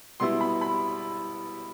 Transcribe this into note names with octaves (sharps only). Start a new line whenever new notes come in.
B2 G3 B3 E4 C6
B5
B5